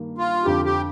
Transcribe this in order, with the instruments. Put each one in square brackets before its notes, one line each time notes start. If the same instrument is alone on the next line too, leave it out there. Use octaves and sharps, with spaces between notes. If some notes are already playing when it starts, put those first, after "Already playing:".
Already playing: [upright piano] G2 D#3 A#3
[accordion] F4
[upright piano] F2 D3 F3 [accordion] G4
[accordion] G4